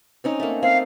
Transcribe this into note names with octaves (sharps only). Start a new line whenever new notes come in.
C4 C#4 D#4
A3 A#3
C4 F5